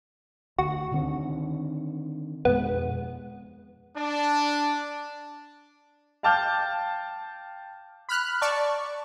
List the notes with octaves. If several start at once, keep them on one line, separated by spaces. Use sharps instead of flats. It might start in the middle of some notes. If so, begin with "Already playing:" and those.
D2 F#4
D3 D#3 C4
F2 B2 G#3 B3
D4
F5 G5 A5 D6 F6 G6
B5 F6 F#6
D5 A5 C#6